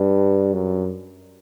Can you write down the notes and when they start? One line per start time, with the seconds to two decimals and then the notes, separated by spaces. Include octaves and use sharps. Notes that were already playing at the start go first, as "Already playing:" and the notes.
Already playing: G2
0.53 F#2